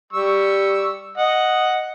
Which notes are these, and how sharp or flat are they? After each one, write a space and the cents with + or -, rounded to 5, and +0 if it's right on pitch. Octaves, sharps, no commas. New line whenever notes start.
G3 +0 C#6 +0 E6 +0
D#5 +0 F#5 +0